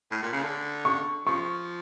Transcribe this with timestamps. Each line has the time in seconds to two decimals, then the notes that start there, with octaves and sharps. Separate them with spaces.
0.11 A2
0.22 A#2
0.32 C#3
0.43 D3
0.85 C#6
1.26 F3 C#6